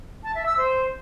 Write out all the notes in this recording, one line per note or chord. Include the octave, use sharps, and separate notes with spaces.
A5
E5
E6
C5